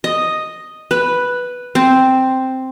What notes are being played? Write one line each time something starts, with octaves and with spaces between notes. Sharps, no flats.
D#5
B4
C4